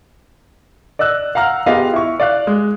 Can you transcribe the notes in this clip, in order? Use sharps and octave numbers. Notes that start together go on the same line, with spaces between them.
D5 D#5 E6 F#6
F5 F#5 A#5 F6
B3 F4 G4 G#4 D#5 F5
E4 C#6
D5 F5 F#6
G#3